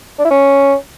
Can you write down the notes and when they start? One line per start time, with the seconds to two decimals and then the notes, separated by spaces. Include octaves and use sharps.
0.19 D4
0.25 E4
0.31 C#4